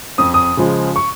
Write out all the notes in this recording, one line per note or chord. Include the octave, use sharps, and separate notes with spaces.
F2 D#6
D#6
C#3 F3 G#3
C#6